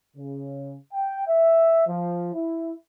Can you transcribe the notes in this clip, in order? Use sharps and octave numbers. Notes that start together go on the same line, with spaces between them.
C#3
G5
E5
F3
E4